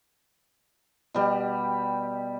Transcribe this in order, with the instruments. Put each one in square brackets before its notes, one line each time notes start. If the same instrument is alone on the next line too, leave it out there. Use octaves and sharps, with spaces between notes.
[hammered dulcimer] B2 G3 G4